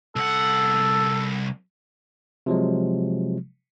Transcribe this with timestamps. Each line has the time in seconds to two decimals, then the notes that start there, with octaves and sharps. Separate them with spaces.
0.16 C2 A4 F#5
2.46 C3 F3 F#3 G#3